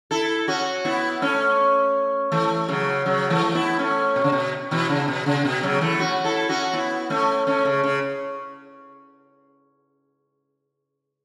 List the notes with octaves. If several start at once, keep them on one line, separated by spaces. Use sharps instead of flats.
E4 A4
C#4 F#4
B3 E4
A3 C#4
E3 A3
C#3 F#3
C#3 F#3
E3 A3
B3 E4
A3 C#4
B2
C#3
B2
B2 E3
C#3
B2
C#3
B2
C#3 F#3
E3 A3
C#4 F#4
E4 A4
C#4 F#4
B3 E4
A3 C#4
A3 C#4
C#3
C#3